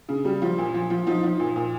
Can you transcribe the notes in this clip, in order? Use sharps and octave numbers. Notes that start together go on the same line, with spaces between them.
C#3
G3
F3
A#2
F3
F3
F3 D#4
F3
A#2
A#2